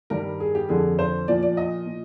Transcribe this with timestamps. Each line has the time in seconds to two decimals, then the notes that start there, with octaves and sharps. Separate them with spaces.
0.10 G2 D#3 G3 A#4
0.40 G#4
0.55 G4
0.69 F2 D3 F3 G#4
0.99 C5
1.28 A#2 F3 D5
1.43 D5
1.57 D#5
1.86 A#2